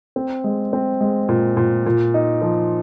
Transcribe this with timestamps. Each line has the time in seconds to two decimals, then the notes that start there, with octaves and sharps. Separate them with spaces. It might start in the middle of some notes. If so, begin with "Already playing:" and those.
0.16 C4
0.44 G#3
0.73 C4
1.01 G#3
1.29 A#2
1.57 A#2
1.86 A#2
2.14 D#4
2.42 F3